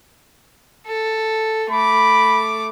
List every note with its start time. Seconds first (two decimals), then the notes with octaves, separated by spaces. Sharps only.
0.87 A4
1.71 A3 B5 D6